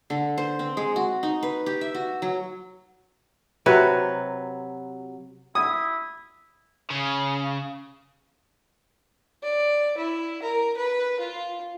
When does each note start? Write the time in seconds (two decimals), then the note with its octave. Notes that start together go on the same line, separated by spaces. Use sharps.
0.10 D3
0.38 C5
0.59 C4
0.77 G#3
0.96 F#4
1.23 D#4
1.43 B4
1.66 G4
1.81 E5
1.94 F#4
2.22 F#3
3.66 C3 F#3 B4
5.55 E4 D#6
6.90 C#3
9.43 D5
9.97 E4
10.42 A#4
10.76 B4
11.20 F4